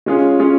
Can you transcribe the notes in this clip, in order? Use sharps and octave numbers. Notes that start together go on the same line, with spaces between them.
G#3 C#4 F4 G#4
G#3 C#4 F4 G#4